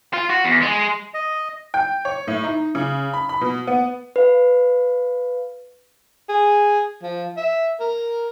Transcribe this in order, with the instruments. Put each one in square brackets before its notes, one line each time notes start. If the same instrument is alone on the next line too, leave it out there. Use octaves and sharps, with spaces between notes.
[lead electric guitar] F4
F#4
E2
G#3
[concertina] D#5
[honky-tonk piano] G5
C#5
A2
D#4
C#3
B5
B5
B2
B3
[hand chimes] B4 F5
[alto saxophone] G#4
F3
E5
A#4